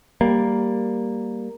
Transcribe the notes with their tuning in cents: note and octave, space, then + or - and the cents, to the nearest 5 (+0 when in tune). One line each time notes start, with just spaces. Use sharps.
G3 +0 A#3 +0